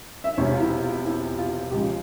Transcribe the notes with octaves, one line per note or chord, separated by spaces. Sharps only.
E5
E1 E2 C3 C#5
F4
E4
F4
E4
F4
C#2 C#3 F3 G#3 G4